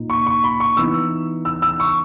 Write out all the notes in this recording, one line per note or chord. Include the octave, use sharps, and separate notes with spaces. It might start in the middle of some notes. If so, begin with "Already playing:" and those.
Already playing: A#2 A#3 D#4
C#6
C#6
B5
C#6
E3 B3 D#4 E6
E6
E6
C#6